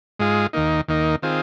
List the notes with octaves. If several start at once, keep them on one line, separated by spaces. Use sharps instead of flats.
G#2 G#3 F4 G#4
D#2 D#3 A#3 D#4
D#2 D#3 A#3 D#4
D#3 C4 F4 G#4